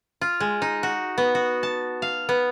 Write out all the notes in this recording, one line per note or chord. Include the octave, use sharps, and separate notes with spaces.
F4
G#3
D#4
F#4
B3
F#4
A5
F5
B3